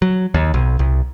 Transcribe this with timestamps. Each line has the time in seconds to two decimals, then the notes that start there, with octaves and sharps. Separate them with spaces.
0.02 F#3
0.34 D#2
0.54 B1
0.79 C2